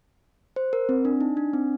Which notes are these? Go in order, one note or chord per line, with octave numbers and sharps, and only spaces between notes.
C5
A#4
C4
D4
D#4
D4
C4